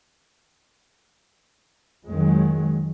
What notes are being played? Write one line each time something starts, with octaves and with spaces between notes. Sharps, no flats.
F2 D#3 F#3 G#3